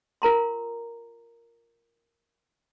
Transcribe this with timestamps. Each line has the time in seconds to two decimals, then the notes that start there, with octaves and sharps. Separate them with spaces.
0.22 F4 A#4 A#5 C6